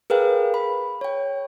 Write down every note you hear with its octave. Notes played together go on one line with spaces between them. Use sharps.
G#4 A#4 B4 F5 G5
B5
C#5 G5